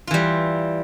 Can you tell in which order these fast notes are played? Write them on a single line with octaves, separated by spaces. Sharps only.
F4 E3 G3